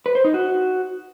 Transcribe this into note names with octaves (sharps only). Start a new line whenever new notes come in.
B4
C5
D#4
F#4